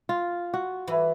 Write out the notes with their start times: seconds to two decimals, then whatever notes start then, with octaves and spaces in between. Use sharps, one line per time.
0.09 F4
0.54 F#4
0.88 E3 B4